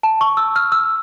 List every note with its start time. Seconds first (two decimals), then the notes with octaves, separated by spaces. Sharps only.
0.03 A5
0.21 C#6
0.37 E6
0.56 F6
0.72 E6